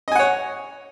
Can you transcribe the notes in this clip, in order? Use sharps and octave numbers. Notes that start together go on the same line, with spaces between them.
C#5 D#5 F#5 G#5